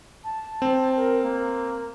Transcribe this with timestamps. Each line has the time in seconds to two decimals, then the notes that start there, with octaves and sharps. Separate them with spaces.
0.24 A5
0.62 C4
0.96 A#4
1.23 A#3